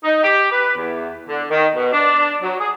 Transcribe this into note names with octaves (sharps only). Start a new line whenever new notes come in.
D#4
G4
B4
E2
D3
D#3
B2
D4
F#3
G#4